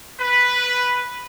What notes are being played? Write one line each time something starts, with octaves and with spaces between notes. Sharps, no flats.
B4